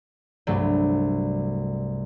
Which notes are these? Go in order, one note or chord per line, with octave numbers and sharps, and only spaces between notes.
C2 G2 F#3 A3